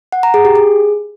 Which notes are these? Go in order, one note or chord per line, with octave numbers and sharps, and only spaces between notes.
F#5
A#5
G#4
G4
G#4